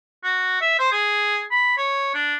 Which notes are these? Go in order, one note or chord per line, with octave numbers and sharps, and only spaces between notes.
F#4
E5
C5
G#4
B5
C#5
D4